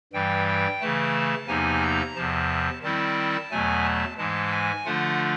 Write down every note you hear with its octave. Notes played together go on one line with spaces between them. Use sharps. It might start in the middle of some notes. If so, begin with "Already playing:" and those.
G2 E3 G3 G5
G5
C#3 E3 A3 A5
E2 C3 F3 A#3 D#4 G#5
A#5
E2 C3 F3 A5
D#3 G3 C4 E4 A5
E2 B2 F#3 A3 G#5
A5
G#2 E3 G#3 A5
G#5
D3 F3 A3 D4 F4 F#5